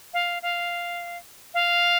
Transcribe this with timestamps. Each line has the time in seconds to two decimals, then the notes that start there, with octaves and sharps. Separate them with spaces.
0.14 F5
0.42 F5
1.54 F5